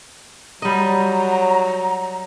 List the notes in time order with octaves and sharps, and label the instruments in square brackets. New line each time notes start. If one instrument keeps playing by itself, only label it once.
[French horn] F#3 [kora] G3 D#5 [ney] A#5